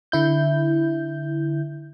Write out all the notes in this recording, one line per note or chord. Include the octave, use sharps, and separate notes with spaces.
D3 E4 G6